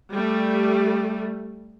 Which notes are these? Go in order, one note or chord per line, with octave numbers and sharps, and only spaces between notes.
G3 A3